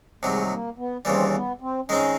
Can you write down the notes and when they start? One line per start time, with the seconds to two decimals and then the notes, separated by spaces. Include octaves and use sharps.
0.22 C2 C3 D#3 F#3 G#3
0.50 A#3
0.78 B3
1.05 D#2 C#3 E3 G3 C4
1.33 B3
1.61 C4
1.88 D#3 G#3 C4 C#4 D#4